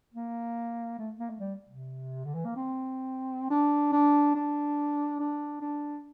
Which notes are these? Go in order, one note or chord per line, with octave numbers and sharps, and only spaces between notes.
A#3
A3
A#3
A3
G3
C3
D3
E3
A#3
C4
D4
D4
D4
D4
D4